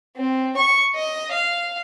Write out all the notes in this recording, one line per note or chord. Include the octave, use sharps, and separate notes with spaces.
C4
C#6
D#5
F5